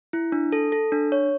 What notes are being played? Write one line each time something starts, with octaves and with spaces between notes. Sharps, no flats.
E4
D4
A4
A4
D4
C#5